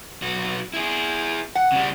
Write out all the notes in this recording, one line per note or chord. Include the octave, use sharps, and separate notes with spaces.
B1 F#4
E4 G#4
F#5
C#3 G3